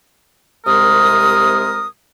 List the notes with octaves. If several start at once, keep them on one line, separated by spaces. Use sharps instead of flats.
C2 C3 G#3 A#4 D#6